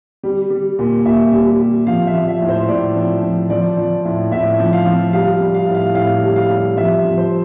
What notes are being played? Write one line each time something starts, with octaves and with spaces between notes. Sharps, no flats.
G3
G3
A#2
A#2 E5
G3
G3
F3 F5
E5
F3
E5
A2
C5
A2 D5
F3
F3
F3 D5
F3
A2
A2 E5
F3
F5
F3
G3 F5
G3
F5
A2
F5
A2 F5
G3
F5
G3
F3 E5
F3
C5